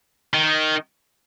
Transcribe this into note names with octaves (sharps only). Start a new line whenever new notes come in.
D#3